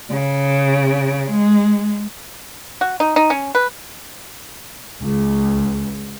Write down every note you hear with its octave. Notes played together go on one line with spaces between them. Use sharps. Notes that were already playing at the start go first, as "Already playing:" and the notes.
C#3
G#3
F#4
D#4
D#4
C#4
B4
C#2